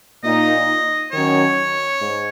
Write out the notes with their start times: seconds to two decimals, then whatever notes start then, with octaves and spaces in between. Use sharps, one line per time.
0.24 A#2 A#3 D#4 D#5
1.12 D#3 F#3 C#4 C#5
1.99 G#2